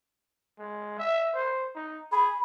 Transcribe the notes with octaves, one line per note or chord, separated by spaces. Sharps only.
G#3
E5
C5
D#4
G#4 B5